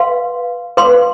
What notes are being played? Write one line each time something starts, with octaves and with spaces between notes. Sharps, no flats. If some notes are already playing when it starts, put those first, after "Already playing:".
Already playing: B4 F5 C6
B4 F5 C6